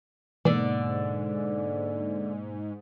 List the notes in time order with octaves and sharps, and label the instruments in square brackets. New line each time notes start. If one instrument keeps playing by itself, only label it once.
[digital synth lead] G#2 [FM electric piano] B2 A#3 [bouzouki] D3 D5 [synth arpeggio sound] E3